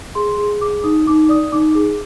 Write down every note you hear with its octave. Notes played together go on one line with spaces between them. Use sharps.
G#4 C6
G#4
G#4 D6
D#4 D#6
D#4 D6
D5 D#6
D#4 D6
G#4 D6